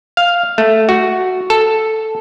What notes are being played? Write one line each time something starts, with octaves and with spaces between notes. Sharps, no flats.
F5
A3
F#4
A4